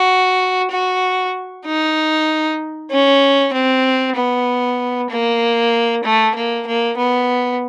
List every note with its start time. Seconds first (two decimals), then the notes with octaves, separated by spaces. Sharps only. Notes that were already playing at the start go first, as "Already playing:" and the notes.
Already playing: F#4
0.71 F#4
1.66 D#4
2.91 C#4
3.54 C4
4.16 B3
5.10 A#3
6.04 A3
6.35 A#3
6.67 A#3
6.98 B3